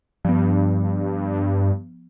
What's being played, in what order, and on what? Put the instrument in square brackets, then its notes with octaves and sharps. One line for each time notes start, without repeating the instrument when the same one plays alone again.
[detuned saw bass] G2 [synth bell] F3 B3